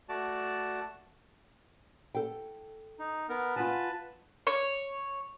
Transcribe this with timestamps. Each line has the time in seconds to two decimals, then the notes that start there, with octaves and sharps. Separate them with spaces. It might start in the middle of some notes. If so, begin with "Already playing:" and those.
0.09 A3 F#4 D5 A5
2.15 A4 G5
2.99 D#4
3.29 B3 A#4
3.56 F4 B4 F#5 G#5 A5
4.47 C#5